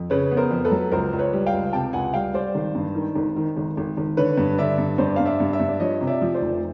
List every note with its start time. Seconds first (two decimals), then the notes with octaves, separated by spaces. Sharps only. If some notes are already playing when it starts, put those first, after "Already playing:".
Already playing: F2
0.10 C#3 B4 C#5
0.31 B3
0.37 A#4 C5
0.51 F2
0.65 A4 B4
0.72 F#3
0.92 C#2 A#4 C5
1.13 C#2
1.19 B4 C#5
1.33 G3
1.46 F5 G5
1.53 C#2
1.73 C3 G5 A5
1.93 C#2 F#5 G#5
2.14 G3 F5 G5
2.34 G3 C5 D5
2.55 G#1
2.75 G2
2.95 D#3
3.15 G#1
3.36 D#3
3.57 G#1
3.77 G#1
3.97 G#1
4.17 D3 B4 C#5
4.37 G2
4.58 D3 D5 E5
4.78 G2
4.98 G2 C5 D5
5.16 G2 F5
5.26 D5 E5
5.40 G2
5.53 D5 E5
5.60 G2
5.69 D5
5.80 F3 C#5 D#5
6.01 C3
6.07 D5 E5
6.22 F3
6.35 C5 D5
6.42 F1